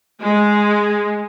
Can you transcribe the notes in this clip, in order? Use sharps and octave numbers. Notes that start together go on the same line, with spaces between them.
G#3